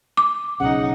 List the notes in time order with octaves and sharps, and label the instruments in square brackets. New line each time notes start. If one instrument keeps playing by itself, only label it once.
[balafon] D6
[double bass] B1 D#4 [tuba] C#3 [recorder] F#5